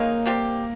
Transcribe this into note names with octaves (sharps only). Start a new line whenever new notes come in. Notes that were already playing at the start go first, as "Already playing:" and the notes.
Already playing: C#3 G#3 A#3 D#4
C3 G3 C4 G4